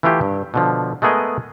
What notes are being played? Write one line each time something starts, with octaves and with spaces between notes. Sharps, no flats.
E3 A3 E4 F4 G4
G2
B2 D3 F3
G#3 A3 B3 G#4 A#4 D#5